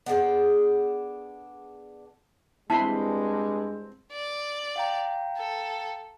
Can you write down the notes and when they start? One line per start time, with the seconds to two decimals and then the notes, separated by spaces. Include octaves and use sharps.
0.06 B3 D4 G#4 A4
2.70 G2 G#3 C4 E4 A5 B5 C6
4.12 D5
4.76 F5 G5 A#5
5.36 A4